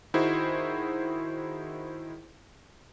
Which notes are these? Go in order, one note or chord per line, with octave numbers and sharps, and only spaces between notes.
D#3 D#4 E4 F#4 G#4 C5